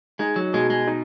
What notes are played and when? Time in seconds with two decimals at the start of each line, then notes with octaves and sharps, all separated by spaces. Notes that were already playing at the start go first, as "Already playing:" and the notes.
0.19 G#3 D#4
0.36 F#3
0.54 B2 G#3
0.70 G#3
0.88 D#4